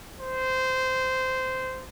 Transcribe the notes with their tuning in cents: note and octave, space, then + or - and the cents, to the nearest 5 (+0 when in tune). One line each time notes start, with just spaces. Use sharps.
C5 -15